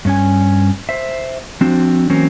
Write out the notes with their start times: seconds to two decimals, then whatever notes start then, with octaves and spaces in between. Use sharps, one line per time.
0.05 G2 C#4 G#5
0.89 C5 E5
1.61 F3 C4 D4 F#4
2.10 E3 F#3 A#3 C4 C#4